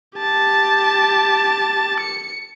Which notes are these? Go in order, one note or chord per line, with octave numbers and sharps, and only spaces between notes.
G4 A5
C#7